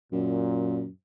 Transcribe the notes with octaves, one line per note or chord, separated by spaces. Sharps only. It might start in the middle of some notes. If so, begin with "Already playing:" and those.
F#2 A#2